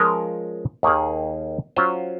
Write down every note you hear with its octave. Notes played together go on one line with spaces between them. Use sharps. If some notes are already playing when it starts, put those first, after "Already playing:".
Already playing: F3 G#3 C#4 F4 A#4
D#2 D#3 A#3 D#4 G#4
F#3 C#4 F4 C5